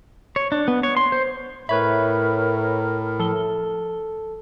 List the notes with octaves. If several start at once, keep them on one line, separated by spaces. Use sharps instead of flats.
C#5
D4
B3
C#5
C6
C5
A2 A#4 B4 C#5 E5 B5
F3 A4 G7